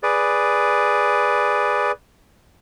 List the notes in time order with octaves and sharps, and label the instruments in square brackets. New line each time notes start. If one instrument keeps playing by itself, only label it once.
[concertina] G#4 B4 D5